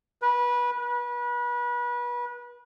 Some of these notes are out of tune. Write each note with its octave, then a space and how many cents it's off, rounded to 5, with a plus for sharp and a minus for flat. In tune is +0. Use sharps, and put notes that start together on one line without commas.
B4 -20
B4 -30